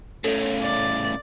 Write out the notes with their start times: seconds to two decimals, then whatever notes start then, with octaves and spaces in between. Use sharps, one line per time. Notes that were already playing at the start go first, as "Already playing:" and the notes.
0.24 A2 C#3 A4 C#5
0.62 D5